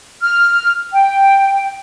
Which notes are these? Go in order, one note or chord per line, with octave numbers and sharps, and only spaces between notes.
F6
G5